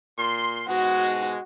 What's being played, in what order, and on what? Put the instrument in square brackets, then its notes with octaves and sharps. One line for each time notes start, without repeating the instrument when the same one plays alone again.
[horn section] A#2 C6
[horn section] G#2 B2 G#3 [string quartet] F#4